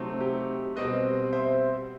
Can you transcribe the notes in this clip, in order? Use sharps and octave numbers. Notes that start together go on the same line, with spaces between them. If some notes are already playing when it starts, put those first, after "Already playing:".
Already playing: C3 F#3 A3 C4 D#4
G4
B2 G3 C4 B4 D#5
C5 E5